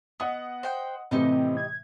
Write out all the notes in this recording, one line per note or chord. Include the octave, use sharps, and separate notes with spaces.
B3 D#5 F#5 D#6
C5 G5
A2 C3 E3 C4 D#4 G4 D#5
G#6